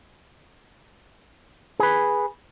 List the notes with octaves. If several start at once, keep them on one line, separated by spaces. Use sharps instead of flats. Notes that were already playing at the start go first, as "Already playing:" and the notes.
G#4 B4